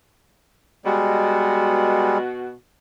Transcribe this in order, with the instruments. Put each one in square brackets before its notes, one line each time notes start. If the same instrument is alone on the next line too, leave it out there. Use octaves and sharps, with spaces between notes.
[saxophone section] B2 F#4 [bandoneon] G3 G#3